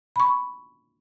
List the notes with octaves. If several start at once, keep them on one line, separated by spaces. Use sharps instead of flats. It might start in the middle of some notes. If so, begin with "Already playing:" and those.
B5 C#6